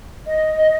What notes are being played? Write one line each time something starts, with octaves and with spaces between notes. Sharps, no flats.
D#5